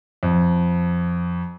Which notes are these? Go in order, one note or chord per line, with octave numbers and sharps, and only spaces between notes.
F2